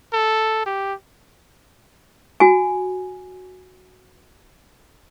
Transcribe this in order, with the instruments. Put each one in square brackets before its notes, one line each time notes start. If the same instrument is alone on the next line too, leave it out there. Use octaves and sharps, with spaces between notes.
[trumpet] A4
G4
[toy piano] F#4 G#5